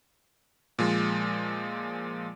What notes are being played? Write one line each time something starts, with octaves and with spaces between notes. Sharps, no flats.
A#2 F3 G#3